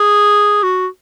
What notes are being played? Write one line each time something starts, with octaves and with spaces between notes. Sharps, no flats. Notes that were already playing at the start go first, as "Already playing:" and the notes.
Already playing: G#4
F#4